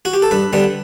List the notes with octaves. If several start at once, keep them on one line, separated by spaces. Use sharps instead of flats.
F#4
G4
A4
G2 B4
D3 G3 B3